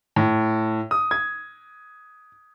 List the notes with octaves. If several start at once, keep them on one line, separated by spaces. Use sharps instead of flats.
A2
D#6
G#6